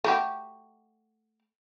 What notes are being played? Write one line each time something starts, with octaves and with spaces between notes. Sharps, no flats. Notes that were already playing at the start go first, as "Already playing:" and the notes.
A3 F#4 G4